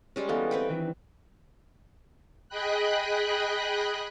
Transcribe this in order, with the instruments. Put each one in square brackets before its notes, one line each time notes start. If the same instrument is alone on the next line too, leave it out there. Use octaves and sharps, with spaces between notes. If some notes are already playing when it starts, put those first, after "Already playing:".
[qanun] G3 G#3 C#4
[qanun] E3 B3 [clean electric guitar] A4 D#5 F5
[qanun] C4 B4 G5
[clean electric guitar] D#3 E3 D4
[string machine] G#4 D#5 G5 B5 F#6